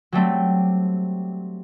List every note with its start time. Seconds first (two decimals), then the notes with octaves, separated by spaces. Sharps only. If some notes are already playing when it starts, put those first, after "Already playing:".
0.12 F#3 G3 A3 C4